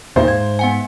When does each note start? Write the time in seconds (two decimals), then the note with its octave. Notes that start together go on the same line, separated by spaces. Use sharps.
0.16 D#2 A#2 D#3 C5 E5 F5
0.28 G#2 G#6
0.59 B3 F#5 G#5